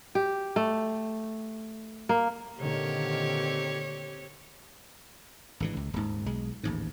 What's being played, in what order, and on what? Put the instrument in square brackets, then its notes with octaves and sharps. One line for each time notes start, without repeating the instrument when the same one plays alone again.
[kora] G4
A3
A#3
[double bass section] A#2 D3 D#3 [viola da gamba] C4 G4 C#5
[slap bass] G#1 D3 E3
C#2
D#1 G#2
B1 G#3
A1 D#2 G#2